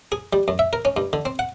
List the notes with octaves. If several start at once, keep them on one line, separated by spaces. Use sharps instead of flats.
G#4
G3
F#2
E5
A#4
C#4
G2
D3
C4
F#5